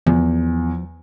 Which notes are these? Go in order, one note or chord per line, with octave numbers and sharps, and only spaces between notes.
E2 F3